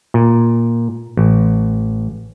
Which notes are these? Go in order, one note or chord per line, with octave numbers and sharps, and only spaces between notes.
A#2
A1